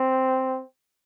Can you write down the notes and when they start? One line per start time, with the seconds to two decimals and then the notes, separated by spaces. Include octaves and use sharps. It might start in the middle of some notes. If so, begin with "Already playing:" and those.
Already playing: C4